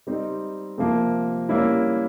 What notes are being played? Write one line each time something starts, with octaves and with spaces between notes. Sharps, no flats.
G3 C4 D#4
C3 F3 A#3
G3 A#3 C#4 E4